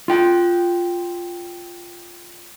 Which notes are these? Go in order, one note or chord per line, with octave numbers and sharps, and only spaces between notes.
F4 G5